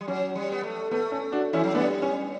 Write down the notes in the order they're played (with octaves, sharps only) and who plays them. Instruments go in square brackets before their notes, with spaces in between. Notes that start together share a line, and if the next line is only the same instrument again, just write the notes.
[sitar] G3
[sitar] F#3 [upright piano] C#4
[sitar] G3
B3
A3
[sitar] A3 [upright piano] B3
[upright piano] C#4
D4 F#4
[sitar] E3 [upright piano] C#4 E4
[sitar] F#3
[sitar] G3 [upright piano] B3 D4
[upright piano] C#4